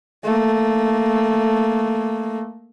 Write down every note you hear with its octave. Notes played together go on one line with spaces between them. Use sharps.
A3 A#3